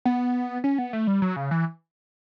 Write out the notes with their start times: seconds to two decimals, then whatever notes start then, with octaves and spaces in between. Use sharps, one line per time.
0.05 B3
0.64 C#4
0.78 B3
0.93 A3
1.07 G3
1.22 F#3
1.36 C#3
1.51 E3